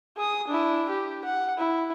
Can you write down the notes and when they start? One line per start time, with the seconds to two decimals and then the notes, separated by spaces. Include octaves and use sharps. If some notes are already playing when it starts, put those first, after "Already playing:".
0.17 G#4 D#6
0.48 D4 E4
0.90 G4
1.25 F#5
1.58 E4